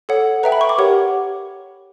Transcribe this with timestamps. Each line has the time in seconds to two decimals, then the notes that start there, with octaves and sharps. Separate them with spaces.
0.09 A4 C#5 F#5
0.43 B4 E5 G5 A#5
0.52 B5
0.61 C#6
0.69 D6
0.78 G4 A#4 C#5 F#5